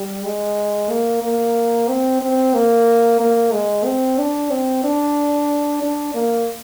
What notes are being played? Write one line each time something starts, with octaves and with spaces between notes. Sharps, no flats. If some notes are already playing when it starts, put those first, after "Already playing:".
Already playing: G3
G#3
A#3
A#3
C4
C4
A#3
A#3
G#3
C4
D4
C4
D4
D4
A#3